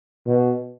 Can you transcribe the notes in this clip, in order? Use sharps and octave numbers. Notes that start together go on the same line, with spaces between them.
B2